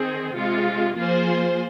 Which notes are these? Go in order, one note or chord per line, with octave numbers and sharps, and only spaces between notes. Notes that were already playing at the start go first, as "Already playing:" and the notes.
Already playing: D#3 C4 G#4
C3 G#3 F4
F3 A#3 F4 G#4 C5